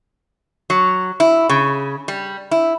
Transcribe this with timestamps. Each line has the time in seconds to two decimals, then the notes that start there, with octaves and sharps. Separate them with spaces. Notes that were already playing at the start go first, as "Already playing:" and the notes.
0.70 F#3
1.20 E4
1.49 C#3
2.08 G3
2.51 E4